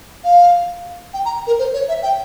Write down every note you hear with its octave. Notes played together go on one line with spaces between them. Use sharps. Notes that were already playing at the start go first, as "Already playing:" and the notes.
F5
G5
A#5
A#4
C5
C#5
E5
G5